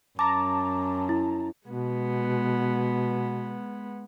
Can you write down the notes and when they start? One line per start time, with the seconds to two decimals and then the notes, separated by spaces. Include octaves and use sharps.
0.19 F#2 A5 A#5 D6
1.09 E4
1.67 B2 G#3 B3